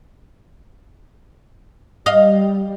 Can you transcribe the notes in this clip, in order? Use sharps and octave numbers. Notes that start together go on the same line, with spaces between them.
G3 D#5 F5